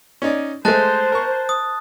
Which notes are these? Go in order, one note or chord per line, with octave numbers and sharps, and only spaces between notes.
C#4 D#4 D5
G#3 A3 C5 A5 F#6 A6
A#4 C#6
D#6